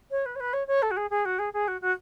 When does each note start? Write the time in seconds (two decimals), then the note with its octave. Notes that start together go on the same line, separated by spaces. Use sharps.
0.11 C#5
0.26 B4
0.35 C#5
0.40 B4
0.53 C#5
0.67 C#5
0.82 A4
0.91 F#4
0.97 G#4
1.10 G#4
1.25 F#4
1.39 G#4
1.53 G#4
1.68 F#4
1.81 F#4